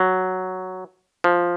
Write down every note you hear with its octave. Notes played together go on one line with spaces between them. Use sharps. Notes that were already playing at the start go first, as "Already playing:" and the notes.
Already playing: F#3
F3